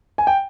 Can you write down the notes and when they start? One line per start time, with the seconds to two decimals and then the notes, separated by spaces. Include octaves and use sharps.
0.18 G#5
0.27 G5